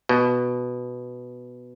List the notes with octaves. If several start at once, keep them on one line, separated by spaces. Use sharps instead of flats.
B2